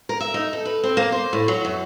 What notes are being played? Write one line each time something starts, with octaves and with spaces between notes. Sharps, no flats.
A#4
E5
D#4
A4
B4
C4
A#3
C5
A2
F#3
F#2